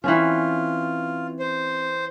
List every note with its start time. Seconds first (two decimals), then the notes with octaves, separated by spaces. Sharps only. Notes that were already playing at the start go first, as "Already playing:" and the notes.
0.04 E3 C4 C#4 F4
1.39 C5